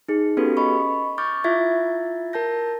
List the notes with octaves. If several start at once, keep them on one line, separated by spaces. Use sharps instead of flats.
D#4 G#4
B3 C#4 F#4 G4 A4 B4
D#5 B5 C#6
C#6 D6 F6 G6 A6
E4 F4 E5 G#6 A6
A#4 A5 G6 A#6